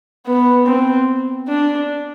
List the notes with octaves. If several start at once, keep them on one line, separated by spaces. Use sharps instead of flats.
B3
C4
D4